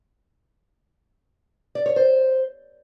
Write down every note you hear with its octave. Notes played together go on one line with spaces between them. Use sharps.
D5
C#5
C5